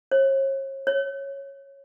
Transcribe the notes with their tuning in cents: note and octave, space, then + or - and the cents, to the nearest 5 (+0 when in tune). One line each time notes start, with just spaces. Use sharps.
C#5 -40
C#5 -10